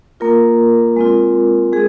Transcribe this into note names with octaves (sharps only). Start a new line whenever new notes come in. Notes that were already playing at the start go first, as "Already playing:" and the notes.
A#3 F4 A#4
G#3 C4 F4
G#3 G#4